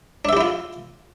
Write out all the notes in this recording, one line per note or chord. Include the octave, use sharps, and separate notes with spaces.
D4 E4 F4 G4 E5